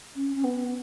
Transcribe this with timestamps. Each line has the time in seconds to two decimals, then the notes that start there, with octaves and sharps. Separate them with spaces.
0.16 C#4
0.35 C#4
0.44 B3